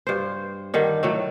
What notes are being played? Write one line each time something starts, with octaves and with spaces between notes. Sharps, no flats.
G2 C5
D3 D#3 G3
A2 F#3 A3